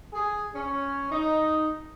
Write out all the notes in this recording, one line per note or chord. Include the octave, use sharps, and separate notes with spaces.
G#4
C#4
D#4